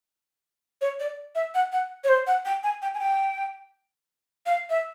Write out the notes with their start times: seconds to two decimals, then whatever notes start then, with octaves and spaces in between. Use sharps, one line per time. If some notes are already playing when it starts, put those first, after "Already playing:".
0.81 C#5
1.00 D5
1.35 E5
1.55 F#5
1.72 F#5
2.04 C#5
2.09 C5
2.27 F#5
2.45 G5
2.63 G#5
2.82 G5
2.94 G#5
3.00 G5
4.46 F5
4.70 E5